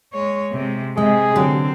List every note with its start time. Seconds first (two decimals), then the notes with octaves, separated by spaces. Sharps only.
0.14 G#3 C#5
0.52 C3 G#3
0.97 C3 G#3 G#4 D#5
1.36 D3 F#3 C4 G4